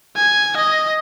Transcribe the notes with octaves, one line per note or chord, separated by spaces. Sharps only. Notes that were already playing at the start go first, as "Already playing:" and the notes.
G#5
D#5